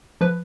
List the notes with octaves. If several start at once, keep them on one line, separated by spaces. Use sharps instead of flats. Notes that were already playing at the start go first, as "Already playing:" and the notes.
F3 B4